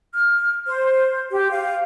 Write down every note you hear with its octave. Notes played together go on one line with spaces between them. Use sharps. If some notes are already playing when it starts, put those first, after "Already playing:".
F6
C5
G4
F5